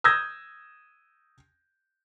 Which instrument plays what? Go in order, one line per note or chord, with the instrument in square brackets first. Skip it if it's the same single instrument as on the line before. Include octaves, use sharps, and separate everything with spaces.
[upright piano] D#6 E6 G6 G#6 A#6